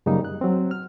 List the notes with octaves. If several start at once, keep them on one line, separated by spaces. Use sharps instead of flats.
F#2 C#3 G3 A#3 D#4
F#6
F#3 C4
F6